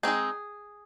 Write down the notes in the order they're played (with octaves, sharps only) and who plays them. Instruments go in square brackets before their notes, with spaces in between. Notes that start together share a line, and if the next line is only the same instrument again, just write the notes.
[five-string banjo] G#3 C4 D#4 G#4